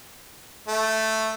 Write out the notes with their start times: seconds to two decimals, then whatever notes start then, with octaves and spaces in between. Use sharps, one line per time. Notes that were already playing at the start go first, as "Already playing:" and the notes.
0.67 A3